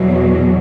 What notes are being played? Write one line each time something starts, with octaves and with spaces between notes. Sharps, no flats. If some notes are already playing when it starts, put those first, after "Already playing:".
Already playing: E2 B2 F#3